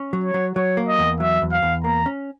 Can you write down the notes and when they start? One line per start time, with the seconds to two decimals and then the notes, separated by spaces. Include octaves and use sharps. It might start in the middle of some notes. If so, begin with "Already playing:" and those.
Already playing: C#4
0.13 F#3
0.24 C#5
0.34 F#3
0.56 F#3 C#5
0.77 A#3
0.88 D#5
0.99 E2
1.20 F#3 E5
1.42 E2
1.52 F5
1.63 E2
1.84 A#3 A#5
2.06 C#4